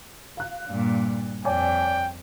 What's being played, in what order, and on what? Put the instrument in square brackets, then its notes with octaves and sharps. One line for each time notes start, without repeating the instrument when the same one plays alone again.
[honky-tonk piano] F5 F#6
[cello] G2 A#2
[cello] F2 [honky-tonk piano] C#5 D5 G#5 [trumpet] G5